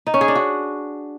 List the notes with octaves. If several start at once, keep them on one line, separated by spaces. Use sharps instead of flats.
D#4
C#4
G#4
D4
F#4